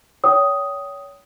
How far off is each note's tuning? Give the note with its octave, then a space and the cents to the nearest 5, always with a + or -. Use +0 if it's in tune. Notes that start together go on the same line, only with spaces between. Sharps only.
C#5 +30 G5 -25 D#6 +5